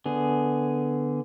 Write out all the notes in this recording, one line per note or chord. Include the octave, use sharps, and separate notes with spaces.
D3 B3 G#4